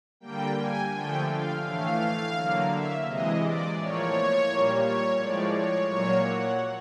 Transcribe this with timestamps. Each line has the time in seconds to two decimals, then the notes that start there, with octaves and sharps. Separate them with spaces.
0.20 D3 G3 A#3 G5
0.56 G#5
0.91 D3 F3 A3 G5
1.27 F5
1.62 A2 E3 A3 F5
2.33 D3 F#3 A#3
2.69 E5
3.04 C3 E3 G#3 D#5
3.39 D5
3.75 A2 F3 A#3 C#5
4.46 A#2 G3 A#3
4.81 C#5
5.17 A2 F3 G#3 D5
5.53 C#5
5.88 A#2 F#3 A#3 C#5
6.24 F#5